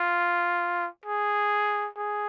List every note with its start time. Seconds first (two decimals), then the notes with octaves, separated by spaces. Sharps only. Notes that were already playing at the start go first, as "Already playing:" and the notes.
Already playing: F4
1.06 G#4
1.97 G#4